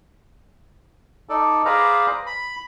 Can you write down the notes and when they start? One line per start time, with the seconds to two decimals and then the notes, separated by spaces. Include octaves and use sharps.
1.29 D#4 A4 D5
1.65 G#4 B4 C5 D5 F5 A#5
2.26 B5